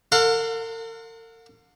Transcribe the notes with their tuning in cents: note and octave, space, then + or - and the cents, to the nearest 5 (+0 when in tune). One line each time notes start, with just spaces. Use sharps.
A#4 -45 F#5 -45 C6 +0